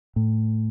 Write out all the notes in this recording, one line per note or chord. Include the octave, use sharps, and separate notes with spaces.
A2